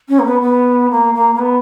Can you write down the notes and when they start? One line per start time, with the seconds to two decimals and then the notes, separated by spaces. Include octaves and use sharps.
0.09 C#4
0.19 A#3
0.25 B3
0.41 B3
0.91 A#3
1.14 A#3
1.35 A#3
1.39 B3